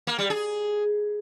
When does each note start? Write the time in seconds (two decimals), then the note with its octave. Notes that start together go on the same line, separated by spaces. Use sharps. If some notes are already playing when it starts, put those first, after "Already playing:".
0.07 A#3
0.19 G3
0.30 G#4